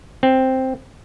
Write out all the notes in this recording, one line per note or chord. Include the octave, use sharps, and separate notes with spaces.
C4